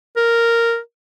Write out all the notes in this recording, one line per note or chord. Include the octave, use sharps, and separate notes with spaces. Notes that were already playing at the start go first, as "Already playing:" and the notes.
A#4